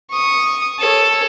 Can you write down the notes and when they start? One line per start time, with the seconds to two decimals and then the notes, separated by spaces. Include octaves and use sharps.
0.11 C#6 D#6
0.79 A4 C#5